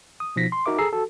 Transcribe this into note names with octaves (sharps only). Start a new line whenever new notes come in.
D#6
B2 F3 D#4 A#6 B6
C6
D#4 F#4 A#4 E5 D6
G#4 A4 A#5 E6 C7
F#4 A4